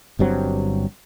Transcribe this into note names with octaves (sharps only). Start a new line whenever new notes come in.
G1 G2 F#3 C4